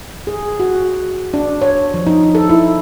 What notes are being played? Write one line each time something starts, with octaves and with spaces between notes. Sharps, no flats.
G#4
F#4
D4
C#5
F3
D#4
A4
E4